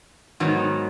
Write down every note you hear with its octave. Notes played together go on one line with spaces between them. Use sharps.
G#2 D#3 F#3 B3